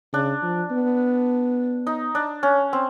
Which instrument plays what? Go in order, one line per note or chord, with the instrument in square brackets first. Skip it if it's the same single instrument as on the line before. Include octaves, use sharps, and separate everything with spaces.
[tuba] C#3 [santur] D4
[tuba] F3
B3
[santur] D#4
D4
C#4
C4